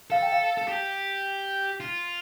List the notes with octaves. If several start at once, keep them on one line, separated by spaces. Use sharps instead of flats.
A4 F5
G5
F5
A4
G4
F4